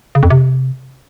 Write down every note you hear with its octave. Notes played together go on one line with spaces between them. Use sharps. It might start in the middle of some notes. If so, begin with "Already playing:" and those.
C#3
F2
C3